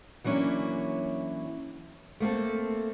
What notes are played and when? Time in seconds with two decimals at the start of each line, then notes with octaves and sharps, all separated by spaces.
0.24 E3 F#3 A#3 C#4 D4 E4
2.20 A3 A#3 C4 A4